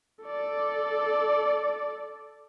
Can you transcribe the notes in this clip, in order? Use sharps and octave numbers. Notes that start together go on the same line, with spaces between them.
A4 D5